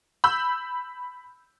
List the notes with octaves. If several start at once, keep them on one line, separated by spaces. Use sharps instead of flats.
B5 E6 G6